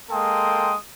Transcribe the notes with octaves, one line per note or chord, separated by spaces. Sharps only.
G#3 A#3 A4 G5 C6 D#6